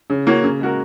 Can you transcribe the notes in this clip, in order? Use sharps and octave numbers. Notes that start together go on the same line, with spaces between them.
C#3
A#3 C#4 F#4
C#3
G#3 F#4 A#4